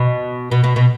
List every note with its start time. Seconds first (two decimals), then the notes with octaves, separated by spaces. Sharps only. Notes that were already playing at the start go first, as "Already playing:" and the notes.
Already playing: B2
0.51 B2
0.64 B2
0.76 B2